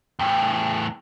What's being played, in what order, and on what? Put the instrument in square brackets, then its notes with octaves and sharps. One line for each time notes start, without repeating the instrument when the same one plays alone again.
[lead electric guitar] E2 A2 [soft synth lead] G5